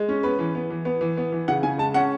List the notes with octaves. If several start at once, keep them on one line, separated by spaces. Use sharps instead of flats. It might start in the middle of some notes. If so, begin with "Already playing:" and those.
Already playing: G#3
C#4
B3 B4
E3
B3
E3
B3
E3
B3
E3
C#3 F#5
C#3 G#5
G#3 A5
C#4 F#5